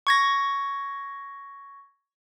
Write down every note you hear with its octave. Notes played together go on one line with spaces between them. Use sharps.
C#6 G#6 A#6